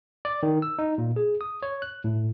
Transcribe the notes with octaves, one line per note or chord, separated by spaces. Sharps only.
D5
D#3
E6
D#4
A#2
G#4
D#6
C#5
F#6
A2